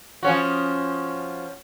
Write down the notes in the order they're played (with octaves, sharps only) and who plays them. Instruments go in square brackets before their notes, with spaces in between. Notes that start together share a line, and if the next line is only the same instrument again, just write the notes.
[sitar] F3 C#4 F#4